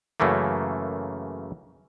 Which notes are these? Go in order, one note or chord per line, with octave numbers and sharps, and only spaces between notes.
F#2 C#3 E3 A3 A#3